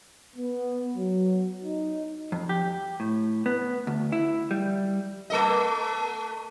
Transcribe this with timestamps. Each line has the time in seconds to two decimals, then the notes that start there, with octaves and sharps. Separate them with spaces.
0.37 B3
0.97 F#3
1.64 D#4
2.32 F2
2.49 G4
3.00 A2
3.46 B3
3.87 D2
4.12 E4
4.51 G3
5.30 A3 A4 D#5